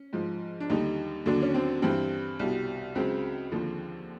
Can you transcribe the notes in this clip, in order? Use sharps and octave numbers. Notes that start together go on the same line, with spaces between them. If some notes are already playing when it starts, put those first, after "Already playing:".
Already playing: C#4
G#2 F3
D4
D#2 D3 G3 D#4
D#2 D3 F#3 D4
C#4
C4
G2 E3 G3 C4
C2 B2 G3
C#2 C#3 F#3 C4
D#2 D3 F3